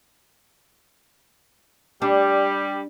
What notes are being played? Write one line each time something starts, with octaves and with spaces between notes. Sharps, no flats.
G3 D4